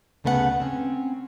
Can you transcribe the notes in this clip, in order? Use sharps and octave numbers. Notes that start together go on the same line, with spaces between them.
D2 C#3 A3 B3 A#4 F#5
C4 C#4